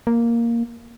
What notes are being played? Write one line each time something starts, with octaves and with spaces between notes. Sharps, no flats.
A#3